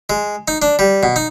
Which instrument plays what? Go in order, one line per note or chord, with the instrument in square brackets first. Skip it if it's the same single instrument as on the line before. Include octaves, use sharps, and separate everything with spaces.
[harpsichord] G#3
D#4
D4
G3
B2
D#4